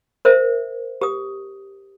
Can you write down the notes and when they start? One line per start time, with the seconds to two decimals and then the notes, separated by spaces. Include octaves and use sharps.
0.25 A#4 C5 E5
1.01 G4 D#6